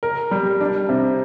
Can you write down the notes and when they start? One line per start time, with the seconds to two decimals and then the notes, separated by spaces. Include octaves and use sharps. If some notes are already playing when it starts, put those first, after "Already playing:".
0.03 A#4
0.31 G3
0.61 D4
0.89 C3